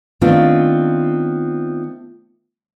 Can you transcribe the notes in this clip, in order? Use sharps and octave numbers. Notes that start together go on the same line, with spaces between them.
D#3 A3 B3 C4 D4 F4